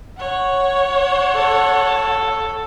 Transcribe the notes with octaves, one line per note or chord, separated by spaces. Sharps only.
C#5 F#5
A4